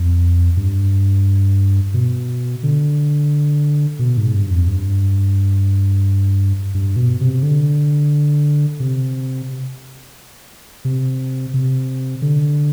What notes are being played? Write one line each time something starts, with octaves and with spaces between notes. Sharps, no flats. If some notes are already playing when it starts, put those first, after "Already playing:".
Already playing: F2
G2
B2
D3
B2
G#2
G2
F2
G2
G2
B2
C3
D3
C3
C3
C3
D3